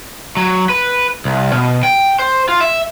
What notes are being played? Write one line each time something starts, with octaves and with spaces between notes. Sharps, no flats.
F#3
B4
C2
B2
G5
C5
F4
E5